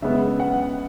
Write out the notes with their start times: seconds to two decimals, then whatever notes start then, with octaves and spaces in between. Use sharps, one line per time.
0.02 C#3 G#3 B3 E5
0.40 F#5